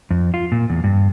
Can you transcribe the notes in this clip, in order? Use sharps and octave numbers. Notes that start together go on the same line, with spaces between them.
F2
F4
A#2
E2
G2